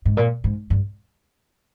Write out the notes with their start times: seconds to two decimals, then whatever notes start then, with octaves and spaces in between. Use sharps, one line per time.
0.05 G#2
0.17 A#2
0.44 G#2
0.70 G2